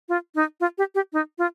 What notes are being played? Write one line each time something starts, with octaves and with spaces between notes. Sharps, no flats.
F4
D#4
F4
G4
G4
D#4
F4